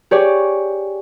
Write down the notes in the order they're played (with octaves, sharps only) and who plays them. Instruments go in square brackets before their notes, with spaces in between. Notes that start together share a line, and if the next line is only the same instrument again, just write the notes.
[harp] G4 G#4 C#5 D5